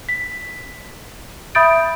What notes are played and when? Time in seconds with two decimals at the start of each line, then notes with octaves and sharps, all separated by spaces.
0.09 B6
1.55 E5 B5 D#6 G6 A6 D7